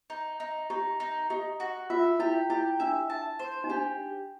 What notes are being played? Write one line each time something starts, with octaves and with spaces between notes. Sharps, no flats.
D#4
D#4
D#4 G4
D#4
D#4 G4
F#4
F4 E5
E4 G4
E4 G4
D4 E5
A5
C5
D#4
D4 G4